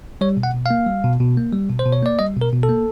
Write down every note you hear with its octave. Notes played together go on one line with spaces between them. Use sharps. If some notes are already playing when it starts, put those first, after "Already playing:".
G3 C#5
B2
F#5
B2
A#3 F5
G3
B2
B2
A#3
G3
B2
C5
B2
C#5
A#3 D5
G3 D#5
B2
A#4
B2
A4
A#3